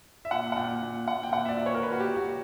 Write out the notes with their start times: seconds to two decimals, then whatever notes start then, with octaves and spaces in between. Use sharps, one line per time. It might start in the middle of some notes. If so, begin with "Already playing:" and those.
0.25 E5
0.31 A#2 F#5
0.52 F#5
0.56 A#2 G5
0.82 A#2
1.06 A#2 F#5
1.23 G5
1.32 A#2 F#5
1.45 E5
1.49 D5
1.57 A#2
1.66 C#5
1.74 A#4
1.83 A#2 B4
1.92 F#4
2.00 G4
2.09 A#2
2.16 F#4